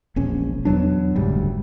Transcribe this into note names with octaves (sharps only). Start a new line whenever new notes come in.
E1 A#1 C#4
E2 B2 F#3 D4
F#1 D2 G#2 G3